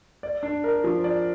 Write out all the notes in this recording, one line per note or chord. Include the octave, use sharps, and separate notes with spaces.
D5
D4
A#4
F3
D5